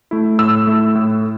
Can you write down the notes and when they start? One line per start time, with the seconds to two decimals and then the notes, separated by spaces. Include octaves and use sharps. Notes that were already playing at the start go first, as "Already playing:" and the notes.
0.11 A3 E4
0.39 A2 E6
0.67 A3 E4
0.95 A2